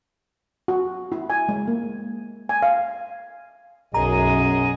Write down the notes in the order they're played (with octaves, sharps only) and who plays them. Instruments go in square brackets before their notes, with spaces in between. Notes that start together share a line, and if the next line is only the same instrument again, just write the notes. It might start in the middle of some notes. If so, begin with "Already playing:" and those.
[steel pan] F#4
E4
G#5
G#3
A#3
G#5
F5
[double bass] B1 [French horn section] F#2 [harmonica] G#4 D#5 [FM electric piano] A#5